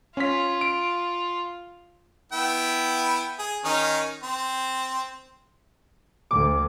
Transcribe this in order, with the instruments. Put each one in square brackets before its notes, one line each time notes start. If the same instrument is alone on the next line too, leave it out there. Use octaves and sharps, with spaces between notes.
[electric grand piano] C#4 B6 [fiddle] F4
[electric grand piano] D7
[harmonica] B3 E4 G5
G#4
D#3 C#4 D#4
C4
[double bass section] D2 [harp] D6